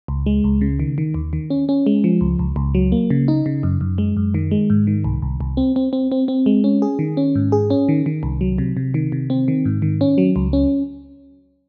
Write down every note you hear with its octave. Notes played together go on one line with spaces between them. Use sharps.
C#2
G#3
C#2
C#3
D#3
D#3
D#2
D#3
C#4
C#4
G#3
F3
C#2
C#2
C#2
F#3
A#3
C#3
D#4
C#3
F#2
F#2
G#3
F#2
D#3
G#3
G#2
D#3
C2
C2
C2
C4
C4
C4
C4
C4
G#3
C#4
G#4
D#3
C#4
G#2
G#4
C#4
D#3
D#3
C2
F#3
C3
C3
D#3
C3
C4
D#3
G#2
D#3
C#4
F#3
C#2
C#4